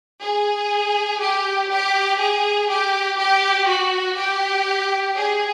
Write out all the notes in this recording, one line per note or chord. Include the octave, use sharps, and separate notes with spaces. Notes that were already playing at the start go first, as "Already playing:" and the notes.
G#4
G4
G4
G#4
G4
G4
F#4
G4
G#4